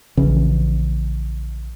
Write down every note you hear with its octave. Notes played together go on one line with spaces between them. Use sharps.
A#1 C#3 E3 C#4